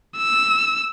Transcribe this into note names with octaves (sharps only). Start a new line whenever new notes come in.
E6